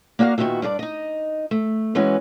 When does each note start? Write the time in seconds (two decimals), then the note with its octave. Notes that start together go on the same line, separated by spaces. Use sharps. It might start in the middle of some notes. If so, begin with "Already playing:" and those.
0.19 A#3 D4 F#4 A#4 F5
0.38 A#2 D#3 B3 F#4 E5
0.62 G2 D4 G#4 D5
0.79 D#4 D#5
1.51 A3
1.95 E3 G#3 C#4 F#4 B4